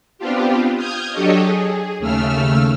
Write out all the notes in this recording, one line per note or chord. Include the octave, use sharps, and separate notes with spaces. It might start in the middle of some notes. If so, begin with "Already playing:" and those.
B3 C4 D4 F4 G4
D#6 F6 G6 G#6
F#3 D4 G4 A4 C#5 D#5
G#4
D#2 C#3 A3 E6 F6